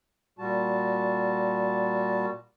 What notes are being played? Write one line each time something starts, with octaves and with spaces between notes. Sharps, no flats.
A#2 G3 F#4 A5